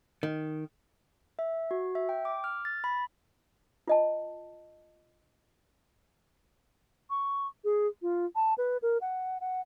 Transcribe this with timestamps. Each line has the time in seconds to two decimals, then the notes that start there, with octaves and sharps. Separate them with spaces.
0.23 D#3
1.39 E5
1.71 F#4
1.95 E5
2.09 G5
2.25 D6
2.44 F6
2.65 A6
2.84 B5
3.87 F4 D#5 A5
7.10 C#6
7.64 G#4
8.02 F4
8.36 A5
8.58 B4
8.82 A#4
9.01 F#5
9.41 F#5